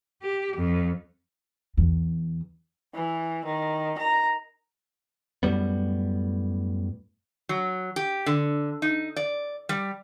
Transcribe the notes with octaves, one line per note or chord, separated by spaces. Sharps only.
G4
F2
E2
E3
D#3
A#5
F#2 A2 G3 B3
F#3
G4
D3
D#4
D5
G3